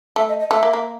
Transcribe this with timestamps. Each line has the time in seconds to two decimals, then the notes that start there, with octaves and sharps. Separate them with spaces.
0.16 A3 E5
0.28 D#5
0.39 D#5
0.51 A3 E5
0.63 A#3
0.73 A#3